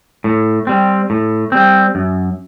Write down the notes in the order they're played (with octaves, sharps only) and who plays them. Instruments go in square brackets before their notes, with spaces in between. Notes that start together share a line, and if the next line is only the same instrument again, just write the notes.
[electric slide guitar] A2
G3 C4
A2
G3 C4
F#2